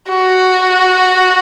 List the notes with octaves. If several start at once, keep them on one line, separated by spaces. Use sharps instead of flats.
F#4